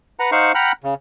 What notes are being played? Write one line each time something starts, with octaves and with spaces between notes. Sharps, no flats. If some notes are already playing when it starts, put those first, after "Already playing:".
B4 F#5 A#5
D#4 C5 F5 F#5 C#6
F#5 G5 A#5 B5 F6 F#6
C#3